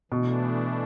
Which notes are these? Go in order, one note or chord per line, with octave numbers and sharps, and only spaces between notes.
B2 E3 A3 D4